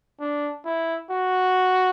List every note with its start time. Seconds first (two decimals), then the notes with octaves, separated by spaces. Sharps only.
0.20 D4
0.65 E4
1.11 F#4